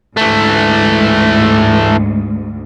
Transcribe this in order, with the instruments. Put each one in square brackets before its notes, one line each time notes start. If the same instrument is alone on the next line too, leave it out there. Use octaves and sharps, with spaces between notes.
[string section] D2 G#2 [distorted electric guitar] E3 A3